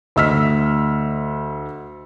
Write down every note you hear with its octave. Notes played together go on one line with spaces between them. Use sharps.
D2 D#5 E6 F6 B6